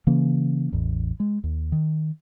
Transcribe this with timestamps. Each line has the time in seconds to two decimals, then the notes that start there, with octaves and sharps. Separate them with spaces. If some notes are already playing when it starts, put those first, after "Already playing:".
0.07 C#3 E3 A#3 C#4
0.72 A1 E2
1.20 G#3
1.44 D#2
1.72 D#3